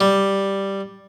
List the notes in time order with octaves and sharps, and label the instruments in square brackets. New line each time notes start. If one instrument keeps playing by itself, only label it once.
[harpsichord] G3